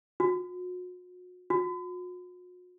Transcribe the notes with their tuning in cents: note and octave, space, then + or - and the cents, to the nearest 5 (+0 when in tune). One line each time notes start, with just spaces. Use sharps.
F#4 -40
F#4 -45